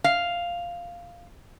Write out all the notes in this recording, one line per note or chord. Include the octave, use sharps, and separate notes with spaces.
F5